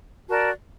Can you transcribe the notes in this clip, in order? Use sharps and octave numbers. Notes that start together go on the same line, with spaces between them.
F#4 A#4 D5 A5